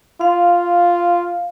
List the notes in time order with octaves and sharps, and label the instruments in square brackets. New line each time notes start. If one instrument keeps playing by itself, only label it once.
[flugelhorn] F4 [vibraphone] F5